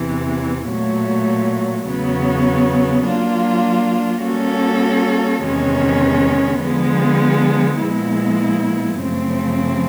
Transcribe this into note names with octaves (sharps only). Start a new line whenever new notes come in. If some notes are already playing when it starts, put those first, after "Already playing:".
Already playing: E2 C3 E3
A#2 F#3 A3
E2 C#3 F#3 B3
F#3 A#3 D4 F4
G3 A#3 C#4 F#4 A4
E2 C3 D#3 G#3 C#4
D3 F3 G#3 B3
A#2 F3 G#3 B3 E4
F#2 C#3 F3 A3 C4